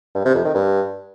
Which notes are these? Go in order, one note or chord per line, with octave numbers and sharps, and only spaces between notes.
G2
C3
F2
D#3
G2